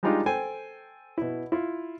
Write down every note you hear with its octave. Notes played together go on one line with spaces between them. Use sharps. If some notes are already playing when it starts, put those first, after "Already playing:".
G3 G#3 D4 D#4 F4 G4
A4 C5 G5 G#5
B2 E4
E4 F4